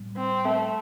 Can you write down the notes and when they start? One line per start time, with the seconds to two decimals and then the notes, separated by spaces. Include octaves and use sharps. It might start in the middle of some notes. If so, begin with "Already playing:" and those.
Already playing: A2 G3
0.17 C4
0.45 A3